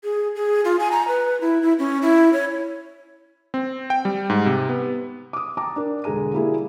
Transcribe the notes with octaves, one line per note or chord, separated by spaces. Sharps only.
G#4
G#4
F4
G#5
A#5
B4
E4
E4
C#4
E4
C#5
C4
G5
G3
G#2
C3
B3
D6 D#6
G5 A5 A#5 D6
D4 A#4
E1 D3 G#4 A#5 D#7
G3 A#3 E4 F#4 G#4